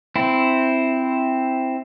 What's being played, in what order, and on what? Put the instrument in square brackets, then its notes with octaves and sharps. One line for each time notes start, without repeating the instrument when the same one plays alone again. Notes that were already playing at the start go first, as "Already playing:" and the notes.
[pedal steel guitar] C4 E4